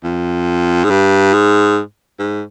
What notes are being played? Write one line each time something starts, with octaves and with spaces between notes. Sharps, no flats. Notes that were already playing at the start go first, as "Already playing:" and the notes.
F2
G#2
G2
G#2
G#2